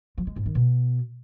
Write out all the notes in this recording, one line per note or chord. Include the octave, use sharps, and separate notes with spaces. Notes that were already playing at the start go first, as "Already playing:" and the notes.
F3
G#3
G#2
D#3
B2